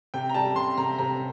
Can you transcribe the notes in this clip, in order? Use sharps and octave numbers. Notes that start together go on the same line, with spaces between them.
C3 G5
A#5
G3 A5
C3 C6
C3 A#5
C3 A#5